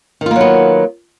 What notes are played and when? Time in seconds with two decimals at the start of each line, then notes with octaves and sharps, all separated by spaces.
0.21 D#3
0.26 F4
0.31 A#3
0.36 F#3
0.41 B3